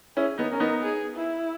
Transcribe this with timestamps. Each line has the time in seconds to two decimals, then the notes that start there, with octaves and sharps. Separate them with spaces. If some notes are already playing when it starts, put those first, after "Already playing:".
0.16 C#4 E4 G#4
0.38 B3 D#4
0.50 C#4 A#4
0.60 B3 D#4
0.82 G#4
1.16 E4